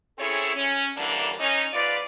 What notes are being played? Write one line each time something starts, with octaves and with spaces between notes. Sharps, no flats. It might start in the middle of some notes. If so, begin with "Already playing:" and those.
C4 C#4 E4 G#4 A4 C#5
C#4
F#2 D3 E3 G3 A#3 D4
C#4 D#4
G#2 F4 B4 D5